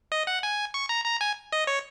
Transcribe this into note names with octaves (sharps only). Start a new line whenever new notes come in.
D#5
F#5
G#5
C#6
A#5
A#5
G#5
D#5
C#5